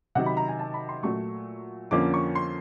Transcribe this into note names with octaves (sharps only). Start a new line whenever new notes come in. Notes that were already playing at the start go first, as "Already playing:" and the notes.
C3 D#3 F#3 F#5
B5
A#5
G#5
A5
B5
C6
A#2 F#3 A3 C#6
F2 D3 F3 A#3 C#4 D6
C#6
C6